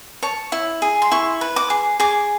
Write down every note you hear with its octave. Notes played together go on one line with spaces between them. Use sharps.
C#5 A5
E4
G#4
C6
E4 C#6
B4
D6
G#4
G#4 D6